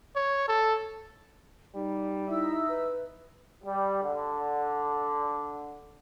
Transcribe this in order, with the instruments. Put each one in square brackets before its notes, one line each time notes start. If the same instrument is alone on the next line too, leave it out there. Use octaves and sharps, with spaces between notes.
[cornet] C#5
A4
[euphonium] G3 [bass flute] D#4
[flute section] D#4 E5 E6 [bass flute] E4
[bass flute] B4
[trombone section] G3
D3